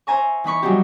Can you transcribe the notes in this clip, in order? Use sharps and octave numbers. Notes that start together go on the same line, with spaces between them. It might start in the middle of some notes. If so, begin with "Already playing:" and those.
C5 E5 G#5 A#5 C#6
E3 D#4 B5 C#6
F#3 G3 D4 D#4 G4